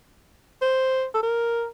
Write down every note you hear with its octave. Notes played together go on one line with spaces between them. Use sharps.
C5
A4
A#4